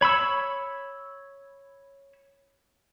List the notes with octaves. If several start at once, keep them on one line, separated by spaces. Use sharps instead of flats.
C#5 B5 C#6 E6